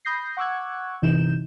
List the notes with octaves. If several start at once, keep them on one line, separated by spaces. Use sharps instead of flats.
B5 D#6 G6 A#6 C7
F#5 C#6 D6 E6 F#6 G#6
G1 C3 E3 D#4 G6 E7